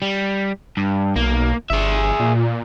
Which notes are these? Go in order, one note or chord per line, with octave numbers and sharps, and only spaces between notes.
G3
G2
B1 A#3
G1 G#4 E5
A#2